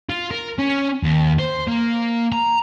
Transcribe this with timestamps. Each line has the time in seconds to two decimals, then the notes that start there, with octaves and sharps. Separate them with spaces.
0.10 F4
0.31 A#4
0.58 C#4
1.03 D#2
1.39 C5
1.68 A#3
2.32 A#5